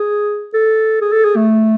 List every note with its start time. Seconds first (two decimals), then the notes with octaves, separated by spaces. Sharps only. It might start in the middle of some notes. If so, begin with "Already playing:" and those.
Already playing: G#4
0.54 A4
1.01 G#4
1.12 A4
1.25 G#4
1.36 A3